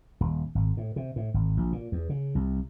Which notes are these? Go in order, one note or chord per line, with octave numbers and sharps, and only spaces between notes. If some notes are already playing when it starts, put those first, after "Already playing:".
D#1
G#1
A2
C3
A2
G#1
A#1
A#2
E2
C#3
C2